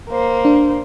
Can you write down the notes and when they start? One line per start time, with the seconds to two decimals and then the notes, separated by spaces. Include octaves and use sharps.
0.10 A#3 C5
0.45 D4